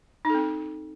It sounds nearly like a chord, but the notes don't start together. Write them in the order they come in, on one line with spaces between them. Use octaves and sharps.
D#4 A4 C4